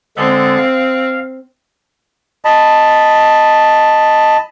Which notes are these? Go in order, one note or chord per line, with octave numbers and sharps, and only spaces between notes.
D3 G#3 C4 A4
F5
D#5 A5 B5